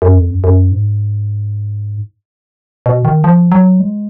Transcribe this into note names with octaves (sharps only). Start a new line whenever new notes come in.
F#2
F2
F#2
F#2
G#2
B2
D#3
F3
F#3
G#3